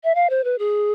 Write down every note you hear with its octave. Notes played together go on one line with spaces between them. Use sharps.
E5
F5
C5
B4
G#4